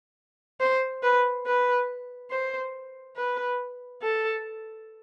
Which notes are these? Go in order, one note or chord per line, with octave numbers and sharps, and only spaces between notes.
C5
B4
B4
C5
B4
A4